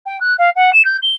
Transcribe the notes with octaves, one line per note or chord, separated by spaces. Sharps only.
G5
F#6
F5
F#5
E7
G6
G7